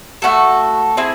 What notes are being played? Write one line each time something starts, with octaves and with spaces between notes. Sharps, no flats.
A3 C#4 F#4 A4
C4 E4 G#4